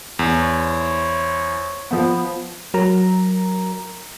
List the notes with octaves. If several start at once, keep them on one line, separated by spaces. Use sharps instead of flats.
E2 E4 C5 C#5
F3 B3
F#3 A#4 A#5